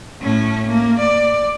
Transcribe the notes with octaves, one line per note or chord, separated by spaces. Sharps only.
A2 C#4
A#3
D5